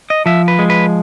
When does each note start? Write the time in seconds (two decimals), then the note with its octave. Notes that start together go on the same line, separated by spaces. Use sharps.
0.10 D#5
0.26 F3 E5
0.48 B4
0.59 G#3
0.70 B4